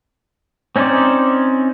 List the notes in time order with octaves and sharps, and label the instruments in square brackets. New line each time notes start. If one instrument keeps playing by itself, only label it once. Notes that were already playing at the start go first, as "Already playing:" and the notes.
[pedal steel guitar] C4 C#4 D#4 C5 D5